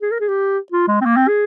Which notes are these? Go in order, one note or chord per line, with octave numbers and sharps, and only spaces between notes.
G#4
A#4
G#4
G4
F4
G#3
C4
A#3
C4
G#4